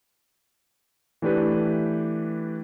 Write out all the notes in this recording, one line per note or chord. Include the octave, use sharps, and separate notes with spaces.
E3 A3 D4 G4 B4